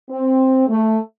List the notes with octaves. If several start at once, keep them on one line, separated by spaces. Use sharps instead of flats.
C4
A3